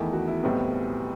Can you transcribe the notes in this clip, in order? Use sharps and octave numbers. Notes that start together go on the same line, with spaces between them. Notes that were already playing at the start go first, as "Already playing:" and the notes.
Already playing: E2 D#3 A3 E4
F#4
E4
B1 A2 G3 B3 C4